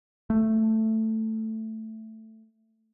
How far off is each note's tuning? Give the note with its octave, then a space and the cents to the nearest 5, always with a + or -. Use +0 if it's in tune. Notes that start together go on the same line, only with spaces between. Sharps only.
A3 +5